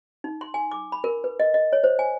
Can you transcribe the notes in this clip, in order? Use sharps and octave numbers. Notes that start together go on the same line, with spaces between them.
D#4
C6
G#5
D6
B5
A#4
B4
D#5
D#5
C#5
C5
G#5